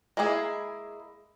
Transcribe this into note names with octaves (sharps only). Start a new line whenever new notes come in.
G#3 A#3 E4 G#4